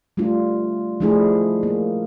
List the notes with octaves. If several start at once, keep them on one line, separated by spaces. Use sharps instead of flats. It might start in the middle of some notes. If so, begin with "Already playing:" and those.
G3 A3 D4 F4
F3 G#3 A3 D4 E4 G#4
A#3